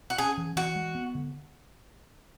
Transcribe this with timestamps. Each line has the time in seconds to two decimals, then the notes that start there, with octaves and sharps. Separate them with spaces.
0.10 F#4
0.18 C#4 G#4
0.37 E3
0.56 E3 F#4
0.75 G#3
0.95 B3
1.15 D3